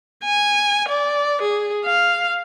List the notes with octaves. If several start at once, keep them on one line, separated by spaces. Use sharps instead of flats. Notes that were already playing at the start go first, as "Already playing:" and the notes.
G#5
D5
G#4
F5